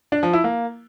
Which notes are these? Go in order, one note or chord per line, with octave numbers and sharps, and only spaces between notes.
D4
F3
E4
A#3